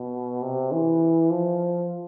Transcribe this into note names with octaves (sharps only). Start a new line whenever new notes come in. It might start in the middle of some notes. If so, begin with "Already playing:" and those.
Already playing: B2
C3
E3
F3